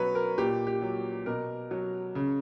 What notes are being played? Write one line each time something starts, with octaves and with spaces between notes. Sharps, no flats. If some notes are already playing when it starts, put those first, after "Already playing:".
Already playing: B2 F#3 B4 C#5
A#4
A#2 G4
G4
F#3
B2 A#4
F#3
C#3